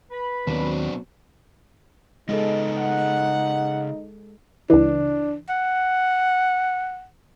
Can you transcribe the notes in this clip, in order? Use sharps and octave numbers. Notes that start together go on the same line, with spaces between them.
B4 B5
D#2 B2 F#3 B3 C4 D4
C#3 G#3 B3 D#4 G#4 A4 D#5
F#5
C#2 E3 D4
F#5